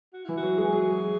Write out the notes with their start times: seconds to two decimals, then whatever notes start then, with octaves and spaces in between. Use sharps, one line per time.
0.13 F#4
0.25 E3 E4
0.37 F#4
0.43 F#3
0.58 G#3
0.63 F#4
0.72 F#3 G#4
0.92 F#3